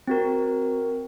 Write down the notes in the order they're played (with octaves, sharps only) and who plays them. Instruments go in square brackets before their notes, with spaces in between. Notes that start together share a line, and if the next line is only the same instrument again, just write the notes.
[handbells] C4 F#4 A#4